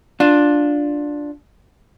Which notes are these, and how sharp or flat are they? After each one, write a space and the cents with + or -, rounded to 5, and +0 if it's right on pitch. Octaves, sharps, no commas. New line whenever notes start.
D4 +0 F4 +15